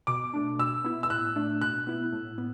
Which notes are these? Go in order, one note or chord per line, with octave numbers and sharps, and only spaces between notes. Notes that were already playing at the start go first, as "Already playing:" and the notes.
B2 D6
A3 D4
B2 E6
B3 E4
E6
A2 F#6
A3 D4
B2 F#6
B3 E4
A2
B3